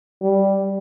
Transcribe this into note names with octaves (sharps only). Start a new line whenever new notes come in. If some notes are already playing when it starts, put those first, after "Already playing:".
G3